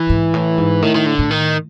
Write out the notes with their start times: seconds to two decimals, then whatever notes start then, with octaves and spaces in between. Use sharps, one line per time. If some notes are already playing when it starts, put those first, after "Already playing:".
Already playing: E3
0.09 G#2
0.34 A2
0.58 G#2
0.82 A2 D#3
0.96 D#3
1.06 D3
1.19 A2
1.31 D#3